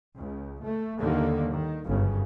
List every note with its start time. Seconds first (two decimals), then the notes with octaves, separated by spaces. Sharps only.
0.19 C#2
0.65 A3
1.00 D#2 D3 D#3 G3 A#3
1.50 D#3
1.85 G1 F#2 C#3